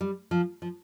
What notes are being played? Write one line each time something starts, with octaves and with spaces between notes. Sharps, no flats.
G3
F3
F3